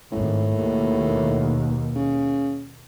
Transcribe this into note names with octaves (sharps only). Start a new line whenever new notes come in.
G#1 A2
D#2 B2
C#3